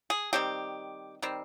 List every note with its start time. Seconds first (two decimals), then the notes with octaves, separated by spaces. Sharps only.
0.10 G#4
0.33 D#3 G3 C4 G4
1.22 D#3 G3 C4